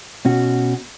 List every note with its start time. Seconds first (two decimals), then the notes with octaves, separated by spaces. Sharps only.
0.25 B2 C#4 F#4